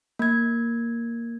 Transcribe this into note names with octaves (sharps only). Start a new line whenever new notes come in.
A#3 G#6